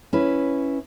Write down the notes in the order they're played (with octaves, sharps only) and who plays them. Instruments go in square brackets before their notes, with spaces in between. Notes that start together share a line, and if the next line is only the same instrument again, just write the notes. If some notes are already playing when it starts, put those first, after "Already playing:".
[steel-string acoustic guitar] C#4 E4 B4